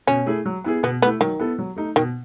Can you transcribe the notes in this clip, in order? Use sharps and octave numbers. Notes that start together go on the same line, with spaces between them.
B2 C#4
A3 E4 G#4
F#3
B3 E4 G#4
B2 B3
A3 B3 E4
D#3 F#3
B3 E4 A4
F#3
A3 D#4
B2 D#3